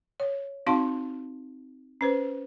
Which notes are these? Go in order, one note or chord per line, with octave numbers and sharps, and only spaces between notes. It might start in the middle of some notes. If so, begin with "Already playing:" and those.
C#5
C4 D#4 F#4 F5 A5 C6
C#4 B4 C5